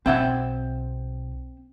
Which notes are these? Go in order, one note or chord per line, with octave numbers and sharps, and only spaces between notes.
B1 C4 E5 F#5